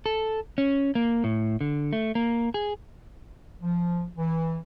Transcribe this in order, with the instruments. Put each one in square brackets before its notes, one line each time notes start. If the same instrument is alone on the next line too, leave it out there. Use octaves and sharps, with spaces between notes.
[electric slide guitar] A4
C#4
A#3
A2
D3
A3
A#3
G#4
[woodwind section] F3
E3